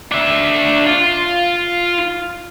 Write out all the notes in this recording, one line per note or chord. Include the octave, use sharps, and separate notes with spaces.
D4 E5
F4